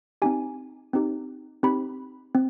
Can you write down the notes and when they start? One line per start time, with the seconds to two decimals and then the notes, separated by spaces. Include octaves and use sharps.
0.22 C4 D#4 G4 G#5
0.93 C4 D#4 G4
1.63 C4 D#4 G4 B5
2.35 C4